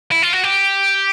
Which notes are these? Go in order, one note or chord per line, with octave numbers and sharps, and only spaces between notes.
E4
F4
F#4
G4